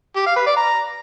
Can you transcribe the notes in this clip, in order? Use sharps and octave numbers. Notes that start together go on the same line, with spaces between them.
G4
F5
B4
D5
A#5